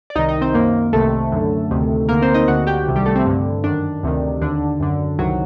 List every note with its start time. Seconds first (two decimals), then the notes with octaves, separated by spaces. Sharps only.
0.10 D5
0.15 C2 C3 D#3 D#4 D#5
0.28 D#4 D#5
0.41 C4 C5
0.54 F#2 D#3 A#3 A#4
0.93 C2 C3 D#3 A3 A4
1.32 F#2 D3
1.71 D2 C3 D#3
2.09 D2 D3 A#3 A#4
2.22 C4 C5
2.34 D#4 D#5
2.48 D2 D3 F#4 F#5
2.67 G4 G5
2.87 C2 C3 D#3
2.96 G3 G4
3.06 A3 A4
3.16 C4
3.26 G2 D3
3.64 F#2 D#3 D4
4.03 D2 C3 D#3
4.41 D#2 D3 D4
4.80 F#2 D3
5.19 C2 C3 D#3 F#3 F#4